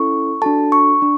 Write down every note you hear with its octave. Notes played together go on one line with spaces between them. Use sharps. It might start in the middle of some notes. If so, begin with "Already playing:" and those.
Already playing: C#4 E4 A4 C#6
D4 F#4 A4 A5
C#6
D4